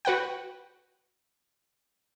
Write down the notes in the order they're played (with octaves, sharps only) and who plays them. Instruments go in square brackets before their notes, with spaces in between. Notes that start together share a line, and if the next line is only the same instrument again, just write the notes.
[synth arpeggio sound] F#4 B4 F#5 G5